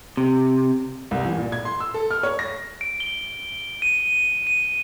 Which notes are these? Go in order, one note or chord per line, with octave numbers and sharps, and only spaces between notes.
C3
C2
E3
A#2
G#6
C6
E6
A4
F6
C#5
A#6
D7
G7
D#7
D#7